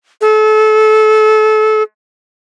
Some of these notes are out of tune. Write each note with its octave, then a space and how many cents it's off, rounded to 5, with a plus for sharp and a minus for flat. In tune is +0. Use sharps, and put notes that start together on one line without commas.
A4 -30